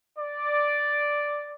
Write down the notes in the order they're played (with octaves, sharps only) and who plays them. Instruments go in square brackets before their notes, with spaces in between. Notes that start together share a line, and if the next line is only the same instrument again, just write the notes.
[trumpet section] D5